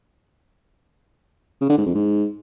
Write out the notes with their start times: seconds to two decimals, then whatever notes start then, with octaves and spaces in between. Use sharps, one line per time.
1.61 C#3
1.70 D3
1.78 G#2
1.86 F2
1.95 G#2